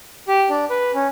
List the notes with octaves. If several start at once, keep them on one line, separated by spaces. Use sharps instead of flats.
G4
D4
B4
C#4